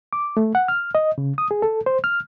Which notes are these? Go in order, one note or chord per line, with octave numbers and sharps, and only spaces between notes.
D6
A3
F#5
F6
D#5
C#3
D#6
G#4
A4
C5
F6